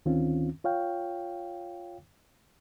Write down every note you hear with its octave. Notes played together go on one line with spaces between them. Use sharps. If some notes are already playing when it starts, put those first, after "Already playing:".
D2 D#3 C4 C#4 F4
F4 C#5 F5 G5